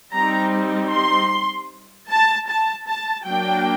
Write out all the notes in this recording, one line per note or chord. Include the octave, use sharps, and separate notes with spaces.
G3 C4 D#4 A#5
C6
A5
A5
A5
F#3 A#3 D4 G5